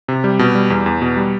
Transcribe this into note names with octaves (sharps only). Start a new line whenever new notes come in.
C3
G3
B2
G3
E2
E2
B2
G3